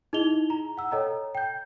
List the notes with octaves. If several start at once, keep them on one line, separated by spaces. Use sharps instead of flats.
D#4 E4 G#4 D#5 F7 G7
A#5
F#5 E6
A4 C#5 D#5 G5 A#5
G5 G6